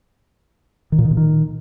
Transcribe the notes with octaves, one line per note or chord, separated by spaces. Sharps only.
D#3
A#2
D#3
A#2
D#3